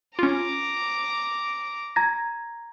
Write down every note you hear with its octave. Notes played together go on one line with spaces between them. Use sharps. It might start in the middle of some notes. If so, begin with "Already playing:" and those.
C#4 F4 A#5 D6
A#5 G#6 A#6